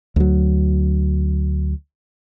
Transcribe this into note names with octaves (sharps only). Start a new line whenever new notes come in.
D2 F#3